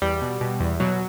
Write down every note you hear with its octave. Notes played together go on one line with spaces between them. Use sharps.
E2 G3
B2
B2
E2
B2 F#3